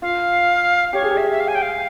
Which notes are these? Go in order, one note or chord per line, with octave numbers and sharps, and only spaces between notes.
F4 F5
G4 C#5
G#4
G4
E5
E5
F5
G#5
G5
F5